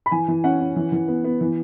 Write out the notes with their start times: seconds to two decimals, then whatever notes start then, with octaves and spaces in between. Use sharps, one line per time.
0.06 B5
0.11 E3 G#5
0.28 E3
0.44 C#4 F#5
0.60 C#4
0.76 E3
0.92 E3
1.08 B3
1.24 B3
1.41 E3